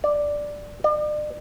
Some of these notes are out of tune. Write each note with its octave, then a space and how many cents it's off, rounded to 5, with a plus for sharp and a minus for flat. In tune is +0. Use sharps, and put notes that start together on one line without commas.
D5 +0
D5 +40